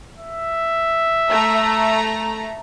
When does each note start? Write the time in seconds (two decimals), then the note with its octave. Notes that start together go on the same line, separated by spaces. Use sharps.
0.19 E5
1.30 A3 A#5